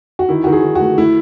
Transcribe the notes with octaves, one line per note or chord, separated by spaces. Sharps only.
F#4
D#3 E4
F#4
D#3
G#4
D#3
F#4
A3
A3 E4